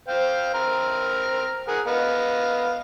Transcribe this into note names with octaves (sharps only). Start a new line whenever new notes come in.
C5 F5 G5
C4 A#5 F6
G#4 A#4 F#5
B3 D#5 F5